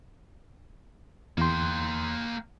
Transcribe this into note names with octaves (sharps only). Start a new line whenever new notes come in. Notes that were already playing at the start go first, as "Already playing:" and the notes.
E2 A#3 G5 C6